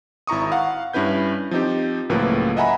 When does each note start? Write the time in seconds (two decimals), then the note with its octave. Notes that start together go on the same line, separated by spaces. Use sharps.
0.27 G#1 E4 A#5 C#6 D#6
0.52 F5 F#5
0.93 G2 C#4 E4 B4 G6
1.51 F3 C4 D#4 G4
2.09 C#2 A2 F3 F#3 A#3 B4
2.57 D#5 E5 F#5 G#5 A#5 B5